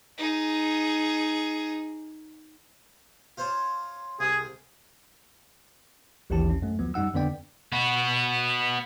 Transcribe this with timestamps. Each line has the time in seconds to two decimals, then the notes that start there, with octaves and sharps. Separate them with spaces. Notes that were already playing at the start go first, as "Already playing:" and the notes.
0.17 D#4 G#4
3.37 F4 C5 C#5
4.20 C2 G#4
6.30 A1 D#2 E3 E4 G4 A5
6.50 C#4
6.62 F#2 A3
6.79 D2 F3 F#3 B3
6.94 F#2 G3 D#4 F#5 E6
7.14 F2 D3 B3 D4 D5 G5
7.72 B3 F#4